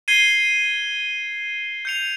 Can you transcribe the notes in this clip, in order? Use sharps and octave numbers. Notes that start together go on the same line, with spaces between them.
G#6 C7 D#7 G7
G6 C#7 F7